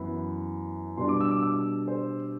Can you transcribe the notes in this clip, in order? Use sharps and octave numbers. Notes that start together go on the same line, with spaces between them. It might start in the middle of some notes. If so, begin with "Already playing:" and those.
Already playing: F#2 E3 B3 B5
B2 G3 D4 C6
D6
E6
D6
E6
C5